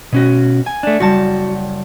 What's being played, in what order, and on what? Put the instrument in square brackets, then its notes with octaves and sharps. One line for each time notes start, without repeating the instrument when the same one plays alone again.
[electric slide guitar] B2 C#4 F#4
[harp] G#5
[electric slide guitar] A3 D4
[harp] F#1 G3 A5 [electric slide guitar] F#4